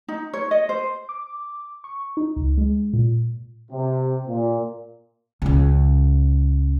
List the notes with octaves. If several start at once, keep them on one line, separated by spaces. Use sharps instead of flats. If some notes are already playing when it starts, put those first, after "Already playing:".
D#4
C#5
D#5
C5
D6
C#6
D#4
C#2
G#3
A#2
C3
A#2
C#2 C#3